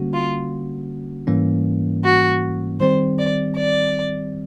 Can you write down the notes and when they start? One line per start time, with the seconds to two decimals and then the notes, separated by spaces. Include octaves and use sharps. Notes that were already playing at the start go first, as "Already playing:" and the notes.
Already playing: D3 G3 A#3 C#4 F#4
0.14 F4
1.27 G#2 E3 G3 A#3 C#4
2.04 F#4
2.80 D#3 G3 C4 C5
3.18 D5
3.56 D5